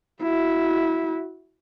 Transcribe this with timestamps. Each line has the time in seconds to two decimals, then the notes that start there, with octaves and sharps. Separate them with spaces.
0.22 E4 F#4